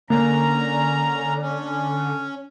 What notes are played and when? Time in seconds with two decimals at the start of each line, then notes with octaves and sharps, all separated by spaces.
0.10 D3 A#3 C#4 A#5
1.41 C#4